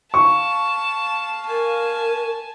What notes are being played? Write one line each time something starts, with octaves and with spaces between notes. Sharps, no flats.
F5 A5 C#6
A#4 G#5 A5